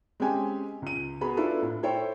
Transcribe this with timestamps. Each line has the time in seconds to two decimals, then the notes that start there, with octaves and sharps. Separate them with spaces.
0.20 G#3 C4 C#4 G4 G5 G#5
0.82 C#2 D#7
1.21 B3 F#4 G#4 B5
1.37 D4 E4 F4 A4 B4
1.62 A2
1.83 E4 A4 C5 C#5 G5